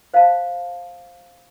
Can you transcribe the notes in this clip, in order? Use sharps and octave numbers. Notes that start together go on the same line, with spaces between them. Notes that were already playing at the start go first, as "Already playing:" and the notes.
C5 F5 A5